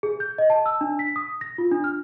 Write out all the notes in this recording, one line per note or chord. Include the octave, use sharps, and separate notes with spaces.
G#4
G6
D#5
A5
E6
D4
B6
D#6
A#6
F4
D4
F6